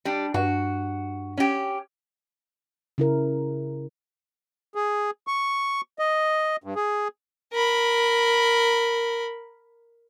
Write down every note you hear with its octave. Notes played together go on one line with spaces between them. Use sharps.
G3 D4
G2 F#4
C#4 G4
C#3 E4 A#4
G#4
C#6
D#5
G2
G#4
A#4 B5